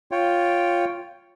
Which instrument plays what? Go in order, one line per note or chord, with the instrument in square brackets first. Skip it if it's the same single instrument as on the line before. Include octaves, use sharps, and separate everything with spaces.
[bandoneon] F4 C#5 G5